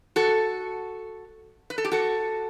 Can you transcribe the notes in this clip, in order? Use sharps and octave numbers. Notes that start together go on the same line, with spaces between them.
F#4 A4
B4
A4
G4
F#4 A4